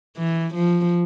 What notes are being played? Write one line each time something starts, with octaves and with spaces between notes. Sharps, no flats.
E3
F3